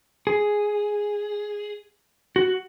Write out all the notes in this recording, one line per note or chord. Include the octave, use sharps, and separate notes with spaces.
G#4
F#4